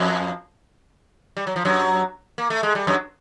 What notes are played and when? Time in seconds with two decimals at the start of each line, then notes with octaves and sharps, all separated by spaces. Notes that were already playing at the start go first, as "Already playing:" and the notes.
Already playing: F2 F3
1.37 G3
1.47 F#3
1.56 F3
1.65 F#2 F#3
2.38 A#3
2.50 A3
2.63 G#3
2.75 G3
2.87 F#2 F#3